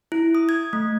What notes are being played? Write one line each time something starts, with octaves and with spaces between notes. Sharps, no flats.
E4
D#6
G#6
A3